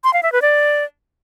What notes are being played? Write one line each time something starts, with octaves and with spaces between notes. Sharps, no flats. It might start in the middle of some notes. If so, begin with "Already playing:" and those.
C6
F5
E5
B4
D5